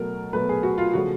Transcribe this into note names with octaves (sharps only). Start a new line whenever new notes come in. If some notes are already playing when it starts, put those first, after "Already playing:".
Already playing: B2 F#3 A3 A#4
B2 F#3 A3 B4
G#4
F#4
F4
C#3 F3 A3 F#4